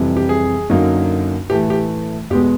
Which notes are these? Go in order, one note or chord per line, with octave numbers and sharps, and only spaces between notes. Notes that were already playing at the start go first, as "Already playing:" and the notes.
Already playing: F2 C3 E3 G3
G4
G#4
F#2 D3 F#3 A#3 D#4
A2 E3 A3 G4
G4
E2 B2 G#3 B3 G4